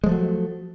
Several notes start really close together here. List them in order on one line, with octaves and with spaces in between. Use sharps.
G#3 F3 A3 F#3